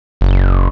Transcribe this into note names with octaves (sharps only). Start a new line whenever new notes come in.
F#1